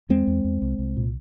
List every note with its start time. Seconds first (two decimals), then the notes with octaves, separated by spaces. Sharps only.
0.09 E2 G#3 C4
0.27 E2
0.44 E2
0.62 C2
0.79 C2
0.97 A#2